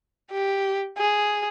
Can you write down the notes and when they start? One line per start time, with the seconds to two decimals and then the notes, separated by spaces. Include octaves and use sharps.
0.31 G4
0.98 G#4